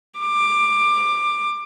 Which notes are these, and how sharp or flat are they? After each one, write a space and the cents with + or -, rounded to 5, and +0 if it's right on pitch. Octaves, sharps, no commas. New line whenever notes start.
D6 +15